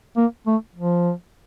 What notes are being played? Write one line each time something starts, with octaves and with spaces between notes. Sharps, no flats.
A#3
A3
F3